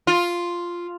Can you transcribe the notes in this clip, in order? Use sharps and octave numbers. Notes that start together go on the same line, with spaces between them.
F4